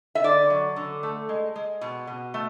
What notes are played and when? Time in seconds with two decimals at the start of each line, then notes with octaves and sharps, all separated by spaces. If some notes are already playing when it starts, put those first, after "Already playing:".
0.15 E5
0.24 D3 D5
0.50 F#3
0.76 D3
1.03 A3
1.29 G#3
1.56 G#3
1.81 B2
2.07 B2
2.34 A3